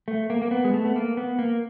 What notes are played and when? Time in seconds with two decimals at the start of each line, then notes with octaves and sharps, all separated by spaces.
0.08 A3
0.30 A#3
0.42 A#3
0.51 B3
0.65 G#3
0.74 A3
0.85 B3
0.96 A#3
1.17 B3
1.39 A#3